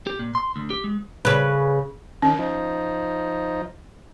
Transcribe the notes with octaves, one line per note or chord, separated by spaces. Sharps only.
G4
A#2
C6
D2
G4
G#3
C#3 B4
D#3 C#4
F3 D#4